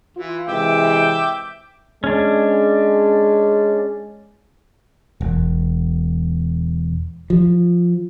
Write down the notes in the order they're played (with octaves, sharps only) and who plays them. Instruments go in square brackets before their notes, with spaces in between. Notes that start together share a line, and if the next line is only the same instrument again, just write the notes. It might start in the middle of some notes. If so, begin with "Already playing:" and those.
[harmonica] E3 [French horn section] F4
[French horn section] C3 E3 G#3 [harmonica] E5 G5 D6
[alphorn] G#3 [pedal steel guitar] C#4 D4
[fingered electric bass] E1
F3